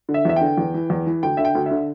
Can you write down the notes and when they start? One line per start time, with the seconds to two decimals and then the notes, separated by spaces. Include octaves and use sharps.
0.09 D3
0.14 E5
0.25 E2 E5
0.36 D3 G5
0.58 E2
0.74 E3
0.90 E2
1.07 E3
1.23 D2 G5
1.37 D3 E5
1.45 G5
1.55 D2
1.66 E5
1.71 D3